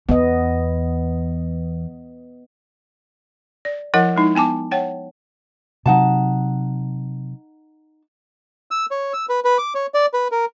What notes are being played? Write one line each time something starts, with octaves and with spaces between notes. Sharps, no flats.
E2 B3 D#5
D5
F3 E4 A#4 D#5 F#5
G#3 D#4 E4
B3 G#5 A5 D6
C#5 F#5 G5 A5
C3 F#3 D#4 F#5 A5
E6
C#5
E6
B4
B4
D6
C#5
D5
B4
A#4